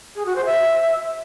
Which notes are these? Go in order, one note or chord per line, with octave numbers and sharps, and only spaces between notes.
G#4
F#4
C5
E5